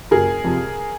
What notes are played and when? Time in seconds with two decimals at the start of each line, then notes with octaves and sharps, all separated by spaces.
0.11 F#1 G#4 A#4
0.44 F2 C3 F3